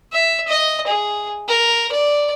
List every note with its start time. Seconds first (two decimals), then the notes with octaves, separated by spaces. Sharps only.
0.13 E5
0.48 D#5
0.87 G#4
1.48 A#4
1.92 D5